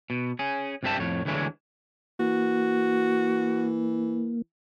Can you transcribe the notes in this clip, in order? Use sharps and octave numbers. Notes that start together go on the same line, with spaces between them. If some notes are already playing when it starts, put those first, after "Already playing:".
B2
C#4 G#4
C2 G2 C4 G4 E5 A5
F2 A2 C#5
D2 D3 E3 G#3 E4 C#5
E3 A#3 F#4